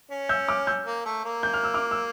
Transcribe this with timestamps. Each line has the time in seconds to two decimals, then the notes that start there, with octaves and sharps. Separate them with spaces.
0.11 C#4
0.29 E6 G6
0.48 D6 F6
0.67 E6 G6
0.86 A#3
1.06 A3
1.25 A#3
1.43 G6
1.54 F6
1.64 E6
1.74 D6 F6
1.91 E6